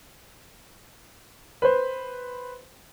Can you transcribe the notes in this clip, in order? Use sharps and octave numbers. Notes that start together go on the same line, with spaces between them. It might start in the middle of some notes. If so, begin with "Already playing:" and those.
B4 C5